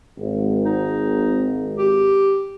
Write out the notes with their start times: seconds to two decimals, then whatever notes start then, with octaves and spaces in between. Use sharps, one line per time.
0.18 G#1
0.65 D#4
1.78 G4